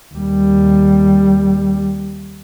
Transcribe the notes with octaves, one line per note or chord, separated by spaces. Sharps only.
D#2 G3